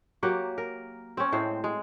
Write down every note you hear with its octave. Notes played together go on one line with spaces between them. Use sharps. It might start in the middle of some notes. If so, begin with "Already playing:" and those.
F#3 A#3 G4 F#5
A#4
C4 C#4
A2 G#3 C4 C5
G#3